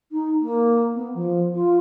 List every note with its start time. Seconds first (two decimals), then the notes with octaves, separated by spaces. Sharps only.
0.12 D#4
0.40 A#3
0.95 B3
1.14 F3
1.54 F4